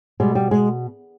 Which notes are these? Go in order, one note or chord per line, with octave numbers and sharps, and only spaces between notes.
B2 G3 G#3
G3
G#3